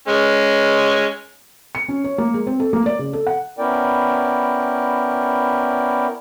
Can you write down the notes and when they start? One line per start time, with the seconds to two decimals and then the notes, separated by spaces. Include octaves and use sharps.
0.08 G#3 C#4
1.75 C#7
1.89 C#4
2.04 C#5
2.18 A#3
2.34 G#3
2.47 C4
2.60 A4
2.73 A#3
2.86 D5
2.99 C#3
3.13 A4
3.27 F#5
3.58 B3 C#4 E4 A#4 D5 G5